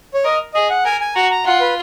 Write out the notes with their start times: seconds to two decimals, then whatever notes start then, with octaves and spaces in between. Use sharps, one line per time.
0.14 C#5
0.25 A#4 D#5
0.54 G#4 D#5
0.70 F#5
0.85 A#4 G#5
1.01 G#5
1.15 F#4 A#5
1.31 A#5
1.45 F4 F#5
1.60 B4